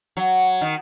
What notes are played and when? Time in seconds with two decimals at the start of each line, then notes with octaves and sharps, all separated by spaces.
0.17 F#3
0.61 D#3